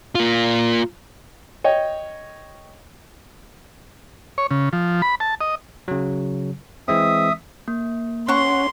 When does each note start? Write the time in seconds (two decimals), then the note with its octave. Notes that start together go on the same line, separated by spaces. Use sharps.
0.15 A#3 F4
1.64 C#5 D#5 G5
4.38 C#5
4.51 C#3
4.73 F3
5.02 B5
5.20 A5
5.41 D#5
5.88 C#3 F#3
6.88 E3 G#3 C4 E5 D#6
7.68 A#3
8.28 C#4 F#5 C6 C#6